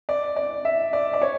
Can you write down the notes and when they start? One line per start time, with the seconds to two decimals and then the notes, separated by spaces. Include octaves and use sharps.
0.09 D5
0.36 D5
0.65 E5
0.93 D5
1.13 D5
1.22 C#5